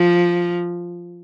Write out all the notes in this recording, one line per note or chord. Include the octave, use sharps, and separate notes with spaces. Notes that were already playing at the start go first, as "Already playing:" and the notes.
Already playing: F3